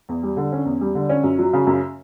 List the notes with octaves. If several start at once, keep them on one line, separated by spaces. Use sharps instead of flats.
E2
G3
D3
C#4
E2
G3
D3
C#4
F#2
F#3
C#3
F#2